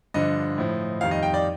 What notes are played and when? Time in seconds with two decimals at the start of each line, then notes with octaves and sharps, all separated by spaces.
0.14 G2 D3 F3 D#5
0.58 A2 F3
1.01 F2 D#3 G3 F5
1.11 D#5
1.23 G5
1.34 D5